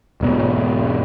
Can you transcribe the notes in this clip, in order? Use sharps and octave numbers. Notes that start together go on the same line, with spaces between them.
E1 G#2 B3